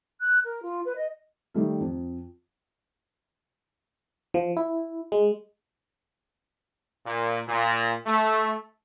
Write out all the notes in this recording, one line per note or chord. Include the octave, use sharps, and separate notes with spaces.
F#6
A#4
F4
B4
D#5
D#3 G3 A3
F2
F3
E4
G#3
A#2
A#2
A3